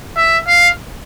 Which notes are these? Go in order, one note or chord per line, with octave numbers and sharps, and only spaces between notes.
E5
F5